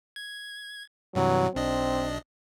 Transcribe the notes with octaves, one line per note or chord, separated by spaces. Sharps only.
G#6
G2 C3 E3 F#3
B1 C4 D4 D#5